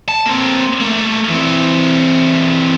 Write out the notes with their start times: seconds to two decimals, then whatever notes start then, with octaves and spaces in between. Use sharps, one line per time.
0.08 A5
0.25 A#3 C4
0.81 A3 A#3
1.30 E3 C4